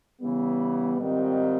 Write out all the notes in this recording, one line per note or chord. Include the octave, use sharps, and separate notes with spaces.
C#3 E3 G3 B3
G#2 D#3 G3 C4 F4